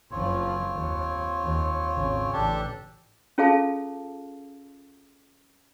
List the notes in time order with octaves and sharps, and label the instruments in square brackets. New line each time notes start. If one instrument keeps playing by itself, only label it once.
[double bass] F#1 F3 [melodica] C4 F4 C#5
[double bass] D#2
D#2
G#1 C#3
[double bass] A1 [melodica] D4 G4 A4
[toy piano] C#4 F4 G#4 A4 F5 A5